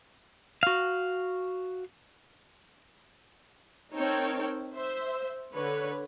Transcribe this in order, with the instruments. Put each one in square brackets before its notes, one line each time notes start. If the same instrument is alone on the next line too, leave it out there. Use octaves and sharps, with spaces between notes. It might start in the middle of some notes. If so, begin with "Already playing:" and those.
[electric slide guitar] F#4 F5
[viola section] C4 D#4 A#4 C#5 G5 A5
C5 E5
D3 B4 C#5